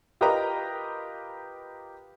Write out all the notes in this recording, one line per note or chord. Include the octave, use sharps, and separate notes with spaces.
F4 G4 A#4 B4 D#5 A#5